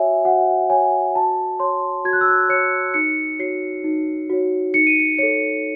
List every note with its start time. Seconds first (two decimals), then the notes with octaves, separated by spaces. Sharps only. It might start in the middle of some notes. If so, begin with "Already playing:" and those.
Already playing: F#4 C#5 E5 G#5
0.25 F#4 F#5
0.70 C#5 G#5
1.15 F#4 A5
1.60 C#5 C6
2.05 F#4 G#6
2.13 F#6
2.21 E6
2.28 F#6
2.49 C#5 C#7
2.94 D#4 C#7
3.39 F#4 C#5 C7
3.84 D#4
4.30 F#4 C#5
4.74 D#4 C#7
4.87 D#7
5.00 C#7
5.18 A4 C#5 C#7